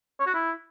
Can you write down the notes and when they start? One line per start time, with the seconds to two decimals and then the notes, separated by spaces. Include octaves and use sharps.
0.20 C#5
0.27 F#4
0.34 E4